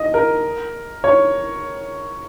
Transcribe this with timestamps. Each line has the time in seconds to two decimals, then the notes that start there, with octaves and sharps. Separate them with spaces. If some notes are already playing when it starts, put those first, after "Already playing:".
Already playing: D#5
0.14 A#4
1.04 C#5